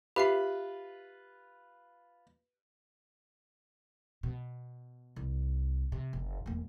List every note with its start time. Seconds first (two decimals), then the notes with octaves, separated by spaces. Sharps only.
0.16 F4 G4 B4 E5 B5 C7
4.23 B2
5.16 C2
5.92 C3
6.13 F#1
6.46 E1 A#3